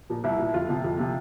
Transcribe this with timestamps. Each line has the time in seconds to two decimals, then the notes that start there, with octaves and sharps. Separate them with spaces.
0.10 A#2 F3
0.24 C2 E4
0.39 A#2 F3
0.54 F2 F4
0.69 C3 F3
0.84 F2
0.99 C3 F3